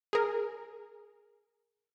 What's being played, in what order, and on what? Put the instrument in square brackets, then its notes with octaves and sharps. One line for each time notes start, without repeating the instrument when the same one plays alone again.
[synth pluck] G#4 A#4